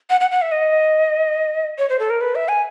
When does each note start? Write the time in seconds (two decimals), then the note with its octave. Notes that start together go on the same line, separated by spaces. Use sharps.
0.10 F#5
0.21 F#5
0.31 F#5
0.42 E5
0.52 D#5
1.78 C#5
1.89 C5
1.99 A4
2.10 A#4
2.21 B4
2.35 E5
2.48 G#5